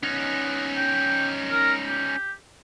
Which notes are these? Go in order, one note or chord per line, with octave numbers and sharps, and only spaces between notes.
B3 C#4 D#4
G5
A#4
G4